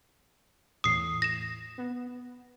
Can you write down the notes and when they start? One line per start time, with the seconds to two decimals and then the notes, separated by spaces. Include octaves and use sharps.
0.84 E2 A2 D#6 C7
1.22 A#6 E7
1.78 B3